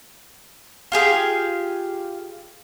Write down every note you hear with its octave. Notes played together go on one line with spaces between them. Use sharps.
F4 G4 G#4 F5